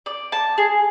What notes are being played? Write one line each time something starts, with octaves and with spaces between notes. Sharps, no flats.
D5
A5
G#4